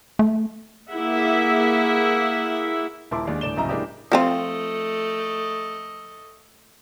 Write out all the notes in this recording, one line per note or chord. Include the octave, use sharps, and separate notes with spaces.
A3
A#3 E4 G#4 E5 F#5
D#1 E4 A#4 A5 C6 D6
D#2 G#3 D4
D#1 A2 D3 D5 E7 G7
D1 G1 C#3 E4 D#5 A#5
G#3 A#3 D4 E4 G4
F3 A3 C4 F4 D#5